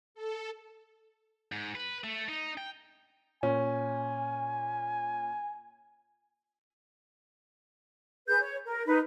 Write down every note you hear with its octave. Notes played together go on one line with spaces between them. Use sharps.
A4
G#2
B4
A3
D#4
G5
A#2 C#4 G#5
G#4 B4 G6
C#5
A#4
D#4 B4